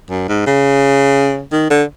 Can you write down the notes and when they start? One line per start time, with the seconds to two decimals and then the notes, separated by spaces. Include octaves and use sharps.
0.10 F#2
0.29 G#2
0.46 C#3
1.52 D#3
1.70 D3